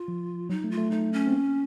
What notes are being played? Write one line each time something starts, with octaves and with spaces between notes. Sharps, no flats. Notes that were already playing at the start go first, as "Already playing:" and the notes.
Already playing: F4
F3
F#3 D#4
A3
F4
A3
A3 D#4
C#4
C4
A#3